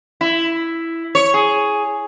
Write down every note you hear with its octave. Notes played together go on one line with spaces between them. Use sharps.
E4
C#5
G#4